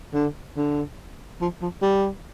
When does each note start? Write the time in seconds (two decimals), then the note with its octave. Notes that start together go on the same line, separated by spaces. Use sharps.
0.14 D3
0.56 D3
1.41 F3
1.62 F3
1.82 G3